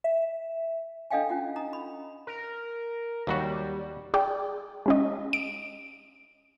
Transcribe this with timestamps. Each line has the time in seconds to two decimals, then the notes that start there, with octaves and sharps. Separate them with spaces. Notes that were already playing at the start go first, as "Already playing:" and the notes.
0.04 E5
1.11 D4 A4 D#5 F5 G5 G#5
1.29 C#4 F4 F#5
1.56 D#4 A#5 D#6
1.73 B5
2.27 A#4
3.27 D#2 F#3 G3 F#4
4.14 G#4 D5 G5
4.86 G#3 C#4 D#5
5.33 D7